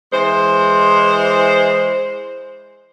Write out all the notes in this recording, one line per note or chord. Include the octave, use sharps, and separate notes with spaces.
E3 G#3 C5